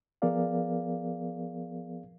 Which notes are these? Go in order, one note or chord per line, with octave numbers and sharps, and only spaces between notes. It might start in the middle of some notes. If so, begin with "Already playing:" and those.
F3 B3 G#4 A#4 D5 F5